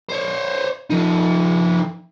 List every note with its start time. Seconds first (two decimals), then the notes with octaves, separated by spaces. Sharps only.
0.09 C5 C#5
0.90 F3 D#4